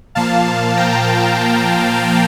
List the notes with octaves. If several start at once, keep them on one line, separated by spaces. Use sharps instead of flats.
A#2 F3 A#3 F5 A5
G5 A#5